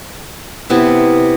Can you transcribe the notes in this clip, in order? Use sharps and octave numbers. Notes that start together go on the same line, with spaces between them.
C3 B3 E4